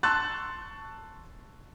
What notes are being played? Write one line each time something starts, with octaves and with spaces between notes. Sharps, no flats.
A5 C6 C#6 E6 F#6 A6